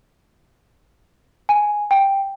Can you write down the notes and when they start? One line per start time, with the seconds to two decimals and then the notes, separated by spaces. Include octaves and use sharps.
1.49 G#5
1.91 G5